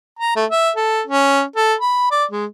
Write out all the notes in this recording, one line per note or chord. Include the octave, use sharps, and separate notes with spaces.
A#5
A3
E5
A4
C#4
A4
B5
D5
G#3